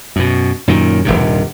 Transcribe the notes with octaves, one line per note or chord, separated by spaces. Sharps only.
F#2 B2
F#2 A#2 D#3
D#1 G#1 G2 C3